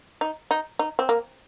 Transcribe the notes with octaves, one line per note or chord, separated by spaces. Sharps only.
D#4
D#4
D#4
C4
A#3